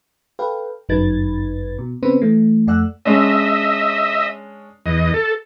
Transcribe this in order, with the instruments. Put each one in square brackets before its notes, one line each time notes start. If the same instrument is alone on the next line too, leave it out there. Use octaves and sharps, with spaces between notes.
[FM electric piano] A4 B4 F5 G5
G1 F#2 D#4 B4 G#6 A6
B2
C#3 B3 C4 B4 C5
E3 A3
F2 A3 D5 F#5 E6 F#6
[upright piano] G#3 C#4 D4 [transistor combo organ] D#5 E5
[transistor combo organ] E2 D#5
A4